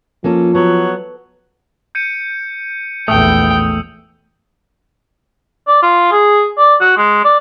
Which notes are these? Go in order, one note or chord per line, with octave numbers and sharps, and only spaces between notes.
F3 A#3 C#4 A4
F#3 B3
G6 C#7 D#7
A#1 E2 A3 G5 D#6 E6
D5
F4
G#4
D5
F#4
G#3
D5